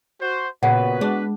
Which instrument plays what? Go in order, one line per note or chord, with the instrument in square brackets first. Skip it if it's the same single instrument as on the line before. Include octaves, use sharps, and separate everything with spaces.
[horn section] F#4 C5
[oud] A#2 C#3 C#4 [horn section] B3 F#4 B4 [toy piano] F#5
[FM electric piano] G#3 [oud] D4